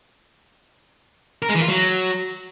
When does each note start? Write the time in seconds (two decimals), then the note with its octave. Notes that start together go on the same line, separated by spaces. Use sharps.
1.42 A#4
1.49 G#3
1.55 E3
1.62 F4
1.68 F#3